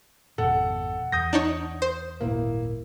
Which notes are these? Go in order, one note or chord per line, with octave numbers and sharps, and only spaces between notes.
G#1 F2 B2 A4 F#5
E2 D#6 G6 A#6
D4 D#4 C#5
C5
D#1 G#1 A#2 A#3 E4